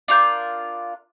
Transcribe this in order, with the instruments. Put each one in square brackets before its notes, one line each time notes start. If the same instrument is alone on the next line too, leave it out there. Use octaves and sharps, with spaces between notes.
[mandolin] D4 F4 A#4 G6